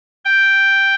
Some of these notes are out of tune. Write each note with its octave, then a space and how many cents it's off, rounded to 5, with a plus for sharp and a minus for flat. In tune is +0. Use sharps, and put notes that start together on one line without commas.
G5 +0